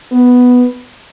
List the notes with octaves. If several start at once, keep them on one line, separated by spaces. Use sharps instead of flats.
B3